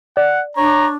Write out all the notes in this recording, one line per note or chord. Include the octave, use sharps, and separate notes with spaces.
D5 F#5
D4 C#5 A#5